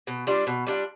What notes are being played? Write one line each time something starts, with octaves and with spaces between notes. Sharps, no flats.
B2
G3 D4 F4
B2
G3 D4 F4